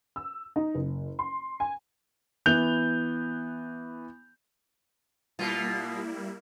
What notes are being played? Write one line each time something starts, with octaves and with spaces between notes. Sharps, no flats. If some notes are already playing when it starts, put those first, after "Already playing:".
E6
D#4
F#1
C6
G#5
E3 B3 G6 F7
B2 G3 A#3 E4 F4